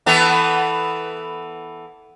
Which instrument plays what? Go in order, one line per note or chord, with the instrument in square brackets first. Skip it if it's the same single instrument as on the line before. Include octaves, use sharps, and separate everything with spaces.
[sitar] E3 B3 A4